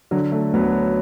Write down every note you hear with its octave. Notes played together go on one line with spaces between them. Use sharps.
D3 F#3
A3
D2 F#3 B3